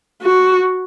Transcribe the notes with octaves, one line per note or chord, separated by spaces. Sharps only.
F#4